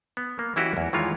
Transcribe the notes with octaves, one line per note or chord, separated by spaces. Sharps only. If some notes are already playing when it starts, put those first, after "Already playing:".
B3
A#3
E3 C#4 E4 F#4 G4 D#5
E2
D#3 E3 G#3 F4 C#5